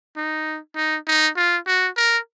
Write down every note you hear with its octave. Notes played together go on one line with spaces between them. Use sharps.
D#4
D#4
D#4
F4
F#4
A#4